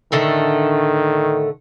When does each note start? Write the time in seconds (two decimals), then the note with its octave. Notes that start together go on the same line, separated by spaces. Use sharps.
0.12 A2 D3 D#3 A3